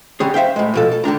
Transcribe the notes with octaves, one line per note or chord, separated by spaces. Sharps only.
D3 G3 C#4 G#4
C5 E5 F5 G5
A2 G#3
B2 F3 A4
A4
D3 D#3 D4 A#5